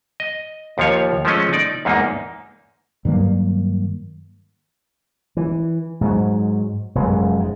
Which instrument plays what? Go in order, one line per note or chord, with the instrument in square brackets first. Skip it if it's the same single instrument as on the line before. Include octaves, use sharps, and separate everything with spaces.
[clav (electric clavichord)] D#5
D#2 F3 C#5
F3 G#3 A3 C#4 D#5
D#4 D5
E2 G#2 A#3 D#4
[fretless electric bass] G2 D#3 F#3 A#3
[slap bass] E3
G#2 F#3
F1 F#2 G#3
G#2